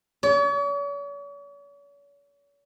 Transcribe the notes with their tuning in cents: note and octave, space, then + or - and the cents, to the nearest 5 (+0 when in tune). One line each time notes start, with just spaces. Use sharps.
C#5 +45